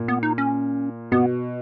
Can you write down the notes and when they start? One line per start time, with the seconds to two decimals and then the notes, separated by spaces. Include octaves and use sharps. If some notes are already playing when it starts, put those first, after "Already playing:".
Already playing: A#2
0.08 B3
0.23 D#4
0.38 C#4
1.12 B2 B3